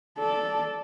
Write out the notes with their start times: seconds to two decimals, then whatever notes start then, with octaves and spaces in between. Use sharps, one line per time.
0.19 A4 D5